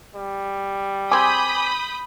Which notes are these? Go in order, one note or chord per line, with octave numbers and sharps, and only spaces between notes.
G3
C4 G#4 G#5 B5 D6 D#6 G6